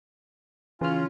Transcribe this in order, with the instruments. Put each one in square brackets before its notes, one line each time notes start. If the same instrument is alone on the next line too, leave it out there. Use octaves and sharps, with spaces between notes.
[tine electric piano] C#3 F6 [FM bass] E3 [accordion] C#4 F4